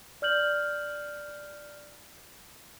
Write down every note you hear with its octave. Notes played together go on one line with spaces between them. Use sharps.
D5 F6 G6 F#7